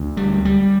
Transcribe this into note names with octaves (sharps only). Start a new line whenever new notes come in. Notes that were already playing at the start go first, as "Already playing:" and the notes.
Already playing: D2
G3
G3